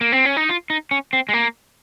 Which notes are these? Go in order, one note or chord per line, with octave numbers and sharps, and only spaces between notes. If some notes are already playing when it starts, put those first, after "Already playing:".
A#3
C4
C#4
D#4
F4
D#4
C#4
C4
G#3
A#3